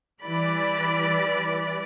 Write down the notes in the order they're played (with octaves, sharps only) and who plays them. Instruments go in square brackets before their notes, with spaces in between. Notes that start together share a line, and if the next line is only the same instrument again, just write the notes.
[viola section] E3 G3 D5 B5